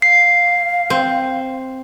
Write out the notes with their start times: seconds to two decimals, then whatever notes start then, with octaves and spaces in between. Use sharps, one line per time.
0.02 F5 C7
0.90 C4